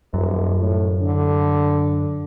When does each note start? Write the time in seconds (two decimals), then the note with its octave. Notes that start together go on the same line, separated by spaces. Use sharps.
0.14 D#1 F#2
0.62 A2
1.02 D3